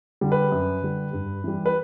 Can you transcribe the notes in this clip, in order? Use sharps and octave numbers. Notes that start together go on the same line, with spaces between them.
D3 G3
B4
F#2
D3 G3
G2
E3 G3
B4